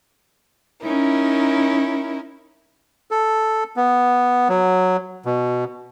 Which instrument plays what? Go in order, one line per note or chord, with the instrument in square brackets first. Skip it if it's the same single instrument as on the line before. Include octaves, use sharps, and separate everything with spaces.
[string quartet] C#4 D#4 E4 A#4
[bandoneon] A4
B3
F#3
B2